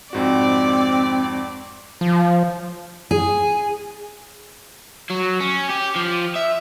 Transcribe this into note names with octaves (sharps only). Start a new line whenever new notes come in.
F2 G#2 C4 F#4 D5
F3
G#4
F#3
C#4
G4
F3
E5